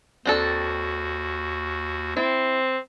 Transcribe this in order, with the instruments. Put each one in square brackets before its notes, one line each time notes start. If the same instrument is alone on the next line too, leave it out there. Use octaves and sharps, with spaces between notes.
[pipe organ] D#2 F#4 [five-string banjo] C4 D4 A4
[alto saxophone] C4 [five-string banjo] E4